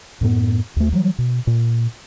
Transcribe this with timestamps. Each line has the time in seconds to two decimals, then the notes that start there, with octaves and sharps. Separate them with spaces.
0.21 F#2 A2 B3
0.76 D#2 A3
0.92 E3 F#3 G3
1.18 B2
1.47 A#2